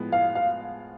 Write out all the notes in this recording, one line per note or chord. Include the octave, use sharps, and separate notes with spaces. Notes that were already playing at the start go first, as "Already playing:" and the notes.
Already playing: A2 F3 G#3 B3
F5
F5